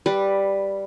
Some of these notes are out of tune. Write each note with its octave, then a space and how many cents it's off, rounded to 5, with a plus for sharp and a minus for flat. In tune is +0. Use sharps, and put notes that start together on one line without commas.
G3 +0 B4 +0